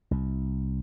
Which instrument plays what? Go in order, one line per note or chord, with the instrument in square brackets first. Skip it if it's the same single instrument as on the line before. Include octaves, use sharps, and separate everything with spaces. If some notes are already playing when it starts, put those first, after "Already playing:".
[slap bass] C2